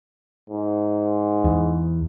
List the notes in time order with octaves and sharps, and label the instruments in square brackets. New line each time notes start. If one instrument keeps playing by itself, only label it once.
[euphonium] G#2
[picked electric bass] E2